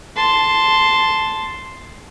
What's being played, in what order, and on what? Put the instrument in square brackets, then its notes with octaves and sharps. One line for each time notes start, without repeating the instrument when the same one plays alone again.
[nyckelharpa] A5 C6